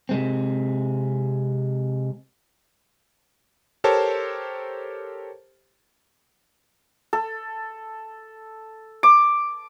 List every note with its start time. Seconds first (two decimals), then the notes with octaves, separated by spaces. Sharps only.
0.09 C3 G#3 C4
3.84 G4 A4 A#4 C5 C#5 A5
7.13 A4
9.03 D6